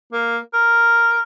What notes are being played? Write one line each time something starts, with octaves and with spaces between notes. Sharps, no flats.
A#3
A#4